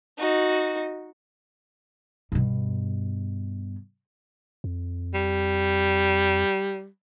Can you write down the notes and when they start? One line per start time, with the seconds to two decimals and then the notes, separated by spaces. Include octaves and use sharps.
0.18 D#4 F#4
2.32 G2 B2
4.64 F2
5.14 G3